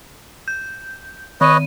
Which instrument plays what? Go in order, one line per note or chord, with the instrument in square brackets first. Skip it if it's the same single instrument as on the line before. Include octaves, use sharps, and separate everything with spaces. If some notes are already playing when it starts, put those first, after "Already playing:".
[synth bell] G6
[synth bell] D#3 D#7 [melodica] B4 C#5 D#5